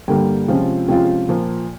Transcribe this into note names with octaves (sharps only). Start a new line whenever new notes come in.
G2 D3 G3 A#3 G5
C3 F3 G#3 C#4 F4
C3 F3 G#3 C#4 F4 G5
A#2 F3 A#3